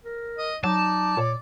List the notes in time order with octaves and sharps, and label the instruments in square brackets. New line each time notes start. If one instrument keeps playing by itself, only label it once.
[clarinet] A#4
[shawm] D#5
[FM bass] F#3 [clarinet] D#4 [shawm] D5 [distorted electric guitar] A5
[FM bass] A#2 [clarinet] C#5